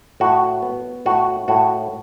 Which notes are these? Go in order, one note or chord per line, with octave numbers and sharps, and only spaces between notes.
A2 F#4
B3
A2 F#4
A2 F#4